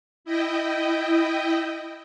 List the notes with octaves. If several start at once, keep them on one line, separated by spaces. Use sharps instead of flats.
E4 D#5 G5